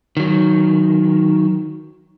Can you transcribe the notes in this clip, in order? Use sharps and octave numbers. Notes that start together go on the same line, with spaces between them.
D#3 F#3